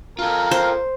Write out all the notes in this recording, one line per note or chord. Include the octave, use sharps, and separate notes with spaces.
F4 A4 A#4
C5